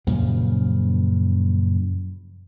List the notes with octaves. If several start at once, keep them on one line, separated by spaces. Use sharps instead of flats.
F#2 A#2 C#3 F3